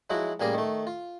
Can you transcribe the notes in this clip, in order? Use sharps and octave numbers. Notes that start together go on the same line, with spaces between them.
F3 F#3 G#3 E4 F#4
A1 G3 A#3 G#4 A#4 D#6
D#3 A3
F4